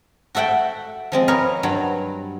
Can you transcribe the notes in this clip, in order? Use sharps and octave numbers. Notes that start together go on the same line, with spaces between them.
F#4 A4 E5 F#5 G5
F3 G#3 C4
A#4 B4 C#5 D#5 F5 G#5
G2 F#3